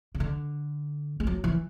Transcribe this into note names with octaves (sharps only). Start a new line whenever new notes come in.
C#3
D3
G#3
F#3
E3